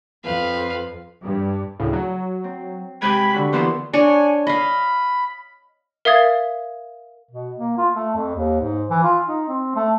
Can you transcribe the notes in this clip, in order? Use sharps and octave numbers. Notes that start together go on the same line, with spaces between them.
F2 B4 F5
G2
D2 A2 C#3
F#3
C4
C3 G#3 G5 B5 G#6
D3 F#4
E3 A#3 B3 C6
D4 C#5 G#5
D#5 F5 B5
A#4 E5 F5 D#6 G#6 A6
B2
A#3
F4
A3
F2
D#2
G#2
E3
F4
D#4
C4
A3